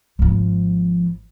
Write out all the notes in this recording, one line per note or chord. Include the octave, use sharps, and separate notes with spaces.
G#1 F3